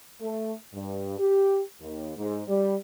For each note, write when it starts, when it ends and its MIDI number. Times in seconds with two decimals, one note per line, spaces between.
0.21 0.52 57
0.73 1.16 43
1.18 1.61 67
1.81 2.12 39
2.17 2.42 44
2.47 2.75 55